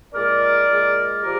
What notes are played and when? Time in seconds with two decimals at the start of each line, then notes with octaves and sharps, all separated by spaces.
0.14 A#2 G#3 A#4 D5
0.69 A#2 G#3
1.23 F3 G4 A#4